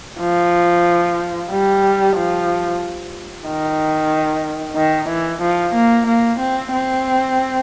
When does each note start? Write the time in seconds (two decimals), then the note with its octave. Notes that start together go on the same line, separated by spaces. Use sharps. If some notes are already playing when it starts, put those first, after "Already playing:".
0.20 F3
1.51 G3
2.16 F3
3.46 D#3
4.76 D#3
5.08 E3
5.41 F3
5.74 A#3
6.06 A#3
6.39 C4
6.72 C4